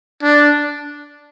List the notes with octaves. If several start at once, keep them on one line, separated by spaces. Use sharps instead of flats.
D4